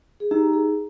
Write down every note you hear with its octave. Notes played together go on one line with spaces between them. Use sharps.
G#4
D#4 G4
G#4